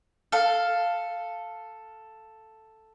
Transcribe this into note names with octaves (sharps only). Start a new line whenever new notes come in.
A4 F5